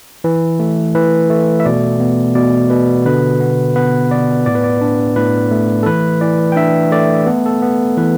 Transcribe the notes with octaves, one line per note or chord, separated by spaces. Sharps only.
E3 B4
A3
E3 B4
A3
E5
B2 D5
B3
B2 D5
B2 B4
D3 B4
B3
B3 B4
B3 D5
A2 D5
B4
D5
D4
A2 B4
A3
A4
E3 B4
E3 D5
G5
D4 E5
A3 D5
B3 A4
A4
B3
E3 B4